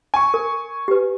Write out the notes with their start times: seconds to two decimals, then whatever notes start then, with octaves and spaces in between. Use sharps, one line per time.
0.14 G#5 C#6
0.34 A#4
0.88 G4 B4